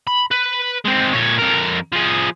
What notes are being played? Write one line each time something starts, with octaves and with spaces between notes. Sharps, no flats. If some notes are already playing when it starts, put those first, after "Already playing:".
B5
B4
G#3 C4
A#2 C#5
F2 A#4
F3 G#4